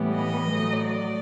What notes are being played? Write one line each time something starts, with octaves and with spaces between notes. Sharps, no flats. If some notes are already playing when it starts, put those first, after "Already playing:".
Already playing: A2 E3 G3 B3
D#5
A2 F#3 A3
D5